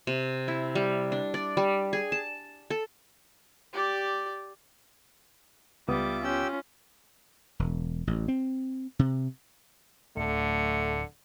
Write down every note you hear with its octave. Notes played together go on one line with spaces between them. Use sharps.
C3
E4
G3
D4
D5
G3
G#4
A5
A4
G4 D5
C#2 G3 B3 F4 E5 D6 D#6
C#4 F4 G4 G5 E6
E1
A1
C4
C3
D1 D3 A3 C#7